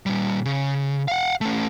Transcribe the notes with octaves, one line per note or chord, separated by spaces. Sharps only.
A#2 G3
C#3
F5 F#5
A3 C#4